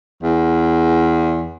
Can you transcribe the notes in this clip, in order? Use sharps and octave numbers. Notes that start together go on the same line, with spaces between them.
E2